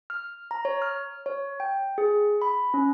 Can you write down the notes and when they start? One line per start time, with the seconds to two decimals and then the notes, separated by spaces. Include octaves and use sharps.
0.10 F6
0.51 A#5
0.65 C#5
0.82 F6
1.26 C#5
1.60 G5
1.98 G#4
2.42 B5
2.74 C#4